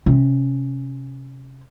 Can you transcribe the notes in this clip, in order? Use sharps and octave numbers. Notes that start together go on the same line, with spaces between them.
C3 C#4